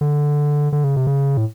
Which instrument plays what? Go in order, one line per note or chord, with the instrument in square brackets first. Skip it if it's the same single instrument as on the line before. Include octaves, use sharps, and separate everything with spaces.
[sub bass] D3
D3
C#3
C3
C#3
A2